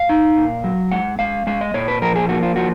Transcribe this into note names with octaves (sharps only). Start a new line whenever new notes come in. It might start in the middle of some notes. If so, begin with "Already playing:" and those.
Already playing: F5
D#4
A#2
F#3
G#3 F#5
G#3 F5
G#3 F5
D#5
A#2 C#5
B4
F3 A#4
G#4
A#3 F#4
F4
F3 F#4